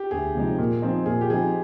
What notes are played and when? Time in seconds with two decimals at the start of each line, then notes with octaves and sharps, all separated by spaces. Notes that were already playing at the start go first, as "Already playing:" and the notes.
Already playing: G4
0.11 D2 G#4
0.35 C3 F3 G#3 D#4
0.58 A#2
0.82 F3 C4 D#4
1.06 A#2 G#4
1.21 G4
1.30 F3 C4 D#4 G#4